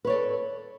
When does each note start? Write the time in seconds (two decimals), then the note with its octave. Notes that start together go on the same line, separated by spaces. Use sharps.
0.05 B4
0.07 C#5
0.10 D5
0.12 A4